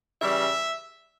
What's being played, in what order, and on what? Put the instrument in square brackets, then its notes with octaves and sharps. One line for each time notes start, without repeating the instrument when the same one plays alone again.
[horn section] C#3 E3 G3 E5